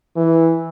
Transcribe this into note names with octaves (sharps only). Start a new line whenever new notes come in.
E3